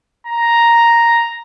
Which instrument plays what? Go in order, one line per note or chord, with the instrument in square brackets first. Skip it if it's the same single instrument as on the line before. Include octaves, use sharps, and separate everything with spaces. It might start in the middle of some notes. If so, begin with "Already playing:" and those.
[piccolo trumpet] A#5